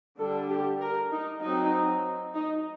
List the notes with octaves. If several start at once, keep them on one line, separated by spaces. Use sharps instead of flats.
D3 G3 D4 A4
G4
A#4
D#4
F#3 C4 D#4
D#4